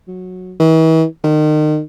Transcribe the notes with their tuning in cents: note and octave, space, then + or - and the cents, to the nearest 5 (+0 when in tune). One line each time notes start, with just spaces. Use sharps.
F#3 -10
E3 -40
D#3 -30